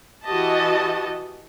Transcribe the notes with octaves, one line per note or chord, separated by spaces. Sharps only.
E3 F#4 G4 D#5 A5